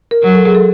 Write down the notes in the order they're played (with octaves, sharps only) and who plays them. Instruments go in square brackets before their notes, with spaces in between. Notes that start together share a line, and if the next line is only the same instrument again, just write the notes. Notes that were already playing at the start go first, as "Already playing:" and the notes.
[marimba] A#4
[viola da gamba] F#3
[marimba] A4
G#4
A4